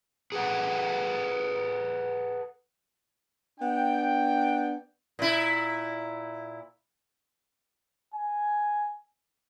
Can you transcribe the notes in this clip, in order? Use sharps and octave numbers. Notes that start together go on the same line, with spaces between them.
G#4 A4 B4 F#5
B3 D4 G5
A#2 E4
G#5